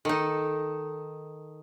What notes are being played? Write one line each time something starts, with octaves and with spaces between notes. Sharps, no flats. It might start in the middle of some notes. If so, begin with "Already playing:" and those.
D#3 D#4 A4